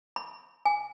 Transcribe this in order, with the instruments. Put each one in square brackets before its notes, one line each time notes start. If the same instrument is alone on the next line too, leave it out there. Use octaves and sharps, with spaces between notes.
[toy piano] B5
G#5